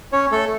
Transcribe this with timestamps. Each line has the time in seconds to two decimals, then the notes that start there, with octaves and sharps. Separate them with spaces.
0.12 C#4 C#5
0.31 A3 A4